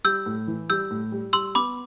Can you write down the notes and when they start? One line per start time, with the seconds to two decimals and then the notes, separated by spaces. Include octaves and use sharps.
0.04 G3 E6 G6
0.26 A2
0.48 E3
0.70 G3 E6 G6
0.91 A2
1.12 G3
1.33 G3 C6 E6
1.55 B3 B5 D6